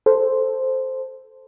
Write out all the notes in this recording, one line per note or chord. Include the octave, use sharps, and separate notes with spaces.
A4 C5